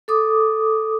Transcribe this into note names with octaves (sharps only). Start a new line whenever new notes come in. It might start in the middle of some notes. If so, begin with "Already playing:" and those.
A4 D6 D#6